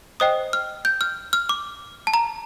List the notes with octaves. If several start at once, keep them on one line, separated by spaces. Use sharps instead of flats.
C5 D#5 G5 D#6
F6
G6
F6
F6
D6
A5
A#5